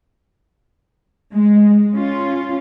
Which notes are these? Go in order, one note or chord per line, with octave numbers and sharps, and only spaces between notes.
G#3
C#4 F4